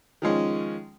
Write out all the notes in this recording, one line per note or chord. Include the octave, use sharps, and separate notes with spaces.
D#3 F3 G#3 C#4